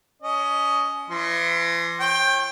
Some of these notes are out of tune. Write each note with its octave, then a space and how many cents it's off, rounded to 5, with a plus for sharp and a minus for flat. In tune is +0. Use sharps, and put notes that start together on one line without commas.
C#4 +20 D#5 +0
E3 +40 C6 +5
C#5 -35 G5 +15